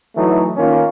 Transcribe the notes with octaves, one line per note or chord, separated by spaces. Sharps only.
E3 F#3 A3 D#4
D#3 A#3 C#4 F4